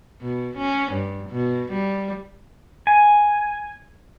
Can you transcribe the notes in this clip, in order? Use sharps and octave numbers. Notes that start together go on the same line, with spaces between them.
B2
C#4
G2
B2
G3
G#5